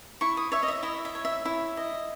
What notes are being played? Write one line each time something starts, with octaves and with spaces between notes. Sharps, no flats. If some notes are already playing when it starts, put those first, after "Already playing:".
E4 C#6
D#6
C#5 E5
D#5
E5
E4 D#5
E5
C#5
E5
E4
D#5